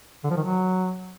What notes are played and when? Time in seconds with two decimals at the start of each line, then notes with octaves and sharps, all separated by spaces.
0.24 D3
0.30 F3
0.37 D#3
0.43 F#3